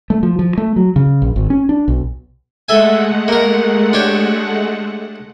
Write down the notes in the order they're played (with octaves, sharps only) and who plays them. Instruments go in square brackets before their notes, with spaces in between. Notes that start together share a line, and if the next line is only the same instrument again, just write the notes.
[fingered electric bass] A3
F3
F3
A3
F#3
C#3
A#1
G#1
C#4
D4
B1
[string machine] G#3 A3 F#5 [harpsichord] A4 E5 G#5
[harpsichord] A#3 A#4
D4 G4 C#5